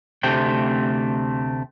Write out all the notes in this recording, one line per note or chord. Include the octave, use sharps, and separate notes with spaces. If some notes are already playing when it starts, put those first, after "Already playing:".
D2 C3 A3 C4 G5